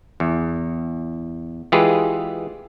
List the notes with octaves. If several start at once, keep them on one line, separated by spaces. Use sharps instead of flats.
E2
E3 G#3 F4 G4 G#4 B4